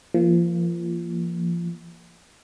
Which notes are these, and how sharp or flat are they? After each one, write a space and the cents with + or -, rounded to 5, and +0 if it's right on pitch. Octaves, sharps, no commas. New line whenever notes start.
F3 -30 A#3 +0